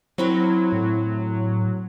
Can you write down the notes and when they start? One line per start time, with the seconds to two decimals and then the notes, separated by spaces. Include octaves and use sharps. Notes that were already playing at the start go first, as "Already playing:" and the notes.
0.18 F#3 C4 E4 A#4
0.72 A2